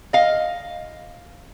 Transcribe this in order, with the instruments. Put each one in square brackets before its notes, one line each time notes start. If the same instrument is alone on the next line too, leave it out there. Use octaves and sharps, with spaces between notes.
[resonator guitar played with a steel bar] D#5 F5